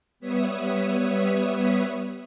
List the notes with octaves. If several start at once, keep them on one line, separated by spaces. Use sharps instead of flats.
G3 B3 B4 C#5 E5 D#6